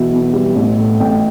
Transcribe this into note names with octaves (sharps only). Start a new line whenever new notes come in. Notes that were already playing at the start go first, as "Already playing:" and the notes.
Already playing: B1 B2 E3 E5
B1
G3
A1
A2
A1 G5